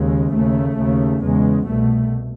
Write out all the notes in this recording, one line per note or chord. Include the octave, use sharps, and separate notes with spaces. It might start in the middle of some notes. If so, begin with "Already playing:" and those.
Already playing: D#2 C#3 G#3
D#2 C#3 A3
D#2 C#3
E2 C#3 G#3
C2 B2 A3